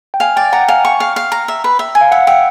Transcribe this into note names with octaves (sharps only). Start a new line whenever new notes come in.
G5
F5 G#5
D5 G5
F#5 A#5
G5
F5 G#5
G5 C#6
F5
F5
A#5
E5
B4
E5
G#5
F5
E5 F#5
E5 G5